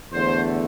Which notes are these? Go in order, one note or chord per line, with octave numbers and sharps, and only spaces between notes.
E2 D3 A3 C5